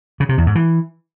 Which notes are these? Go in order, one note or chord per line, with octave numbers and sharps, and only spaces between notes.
C#3
C3
E2
G#2
E3